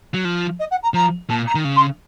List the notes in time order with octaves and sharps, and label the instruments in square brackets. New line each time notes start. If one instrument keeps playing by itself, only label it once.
[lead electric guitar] F#3
F3
[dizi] D#5
F#5
A#5
[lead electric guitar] F3 [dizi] A#5
[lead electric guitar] A#2 [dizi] A5
[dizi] A#5
[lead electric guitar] D#3
C#3
[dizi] C6